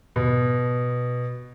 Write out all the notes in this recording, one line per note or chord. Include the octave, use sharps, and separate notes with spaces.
B2